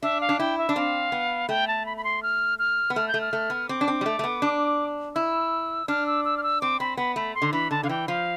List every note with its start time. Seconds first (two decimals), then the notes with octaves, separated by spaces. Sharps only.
0.03 D4 E5
0.21 F5
0.29 D4
0.39 E4 G5
0.58 E5
0.69 D4
0.76 C4 F5
1.12 B3
1.49 A3 G5
1.67 A5
1.86 B5
1.97 B5
2.04 C6
2.23 F6
2.59 F6
2.90 B3
2.96 A3 F6
3.08 G6
3.14 A3
3.21 F6
3.33 A3
3.50 B3
3.69 C4 D6
3.81 D4
3.88 C4
4.01 G3
4.06 A3
4.19 A3
4.24 B3
4.42 D4
5.15 E4 E6
5.88 D4 F6
6.07 E6
6.25 E6
6.38 F6
6.43 E6
6.61 C4 D6
6.80 C4 B5
6.97 B3 B5
7.16 A3 B5
7.35 C6
7.42 D3
7.53 E3 B5
7.71 D3 A5
7.83 D3 F5
7.89 E3 G5
8.08 F3 F5